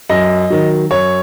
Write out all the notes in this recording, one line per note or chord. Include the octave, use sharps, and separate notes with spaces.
F#2 D#5
D#3 F#3
F#2 C#5